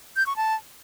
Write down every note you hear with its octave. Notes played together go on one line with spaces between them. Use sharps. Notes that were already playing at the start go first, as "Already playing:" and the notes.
G6
C#6
A5